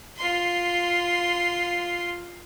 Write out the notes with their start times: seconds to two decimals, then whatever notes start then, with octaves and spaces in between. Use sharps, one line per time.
0.17 F4 C6